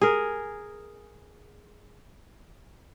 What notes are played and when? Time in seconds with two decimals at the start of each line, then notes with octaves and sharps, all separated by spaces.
0.02 G#4 A#4